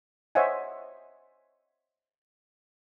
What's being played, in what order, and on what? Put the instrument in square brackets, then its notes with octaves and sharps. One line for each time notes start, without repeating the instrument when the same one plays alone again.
[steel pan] C5 C#5 D#5 E5 F#5 G#5